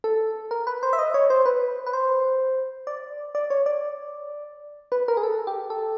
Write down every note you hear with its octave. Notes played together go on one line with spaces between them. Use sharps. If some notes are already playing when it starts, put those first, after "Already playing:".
A4
A#4
B4
C5
E5
D#5
C#5
C5
B4
B4
C5
D5
D5
C#5
D5
B4
A#4
G#4
A4
G4
A4